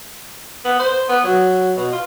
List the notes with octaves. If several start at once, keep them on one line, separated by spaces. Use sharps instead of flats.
B3
C5
B3
F#3
B2
F4